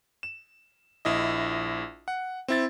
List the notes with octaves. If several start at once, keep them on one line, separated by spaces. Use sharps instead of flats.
E7
A#1 E4 D#5
F#5
C4 E4 A6